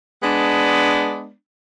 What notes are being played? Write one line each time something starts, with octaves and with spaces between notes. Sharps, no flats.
G#3 B3 D4